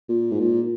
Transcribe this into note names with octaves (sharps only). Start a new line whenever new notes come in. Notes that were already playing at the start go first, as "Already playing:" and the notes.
A#2
G#2
A#2